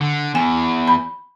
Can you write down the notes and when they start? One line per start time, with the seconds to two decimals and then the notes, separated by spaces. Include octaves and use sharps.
0.01 D3
0.35 E2 G#5
0.87 B5